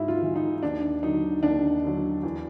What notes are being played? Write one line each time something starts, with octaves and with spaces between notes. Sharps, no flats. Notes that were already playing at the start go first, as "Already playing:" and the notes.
Already playing: G#2 E4 F#4
F4
E3
D#4
D#2 D4
D3 F#3 D#4
D#2 D4
D3 F#3
E2